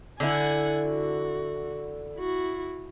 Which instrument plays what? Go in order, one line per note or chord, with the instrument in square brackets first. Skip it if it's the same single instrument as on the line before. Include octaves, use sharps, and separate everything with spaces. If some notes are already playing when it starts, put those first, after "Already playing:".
[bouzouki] D3 E4 [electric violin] F#5 G#5
[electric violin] F#4
E4 F#4